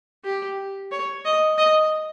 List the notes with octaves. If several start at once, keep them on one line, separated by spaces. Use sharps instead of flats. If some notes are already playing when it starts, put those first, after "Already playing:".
G4
C#5
D#5
D#5